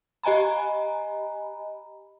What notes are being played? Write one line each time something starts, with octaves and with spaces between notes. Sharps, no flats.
G4 D#5 G#5 A#5 B5